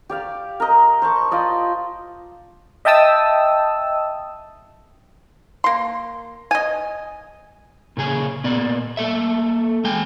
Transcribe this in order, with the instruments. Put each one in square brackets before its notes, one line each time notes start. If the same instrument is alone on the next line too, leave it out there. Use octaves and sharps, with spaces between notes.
[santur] G4 D5 F5
A#4 D#5
C5 A5 C#6
F4 D5 D#5
[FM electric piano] D#5 E5 G5 A5 D#6 E6
[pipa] A#3 C6
D#5 G#5
[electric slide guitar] A#2 C#3 G#4 G#5
A#2 B3 D5
A#3 A4 E5
G#3 G5 G#5